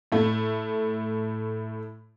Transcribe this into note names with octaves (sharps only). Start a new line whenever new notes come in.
A2 A3